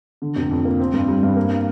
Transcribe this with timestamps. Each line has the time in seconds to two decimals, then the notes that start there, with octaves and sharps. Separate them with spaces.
0.22 D3
0.36 F1
0.51 F2
0.65 A#3
0.80 C4
0.93 G2
1.08 G3
1.23 G2
1.36 A#3